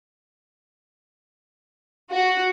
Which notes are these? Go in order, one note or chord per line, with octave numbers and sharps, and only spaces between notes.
F#4